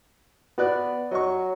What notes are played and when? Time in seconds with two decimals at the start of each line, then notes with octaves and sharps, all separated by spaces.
0.58 B3 F#4 D5 F#6
1.11 F#3 D#5 C#6